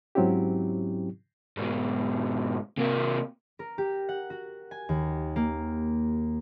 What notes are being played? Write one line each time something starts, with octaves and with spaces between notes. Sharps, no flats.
G#2 F#3 C4 C#4 E4 G4
G#2 B2
C3 A#3
A#4
G4
F#5
F#4
G#5
D#2
A#3